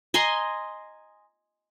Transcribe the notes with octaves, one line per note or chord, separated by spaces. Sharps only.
D#5 G#5 A#5 C6